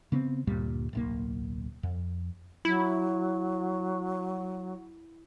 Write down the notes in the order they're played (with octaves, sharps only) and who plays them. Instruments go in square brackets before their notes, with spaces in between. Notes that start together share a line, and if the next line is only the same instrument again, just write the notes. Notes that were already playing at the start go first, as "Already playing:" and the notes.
[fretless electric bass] C#3 B3 C4
D2 G2 A#2 G3
D1 B1 A#3
F2
[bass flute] F#3 [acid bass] E4